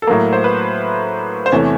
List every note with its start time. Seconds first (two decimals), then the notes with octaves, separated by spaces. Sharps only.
0.02 A4
0.07 A2 F#3 A#3 A#4
0.33 C5
0.44 B4
1.46 C5
1.52 E2 C3 E3 A3 C#5